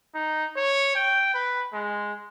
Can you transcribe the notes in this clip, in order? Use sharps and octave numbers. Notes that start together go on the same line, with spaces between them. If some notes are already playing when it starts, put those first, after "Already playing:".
D#4
C#5
G5
B4
G#3